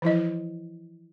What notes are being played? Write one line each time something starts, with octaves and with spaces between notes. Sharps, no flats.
E3 F3 E4 D#5